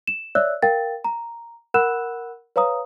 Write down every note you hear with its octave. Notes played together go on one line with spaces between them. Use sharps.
E7
C#5 D5 E5 E6 F#6
A#4 F5 G5 A6
A#5
A#4 F#5 B5 E6 F#6 E7
B4 C#5 F5 A#5 D#6